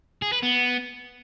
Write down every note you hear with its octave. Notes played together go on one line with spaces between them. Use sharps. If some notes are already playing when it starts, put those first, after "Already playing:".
G#4
B4
B3